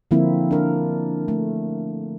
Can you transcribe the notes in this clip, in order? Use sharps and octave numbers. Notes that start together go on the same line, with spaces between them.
D3 F3 A#3 C4 E4
D4 A#4
A3